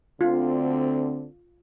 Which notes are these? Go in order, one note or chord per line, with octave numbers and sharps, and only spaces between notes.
D2 D3 C4 F4